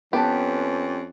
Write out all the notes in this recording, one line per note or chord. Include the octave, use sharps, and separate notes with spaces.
F2 B3 C#4 G4 B4 A5